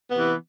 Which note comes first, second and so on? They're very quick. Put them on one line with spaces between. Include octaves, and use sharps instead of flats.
B3 C3 E3